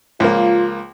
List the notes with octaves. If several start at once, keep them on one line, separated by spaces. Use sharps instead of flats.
C#2 F3 A#3 F4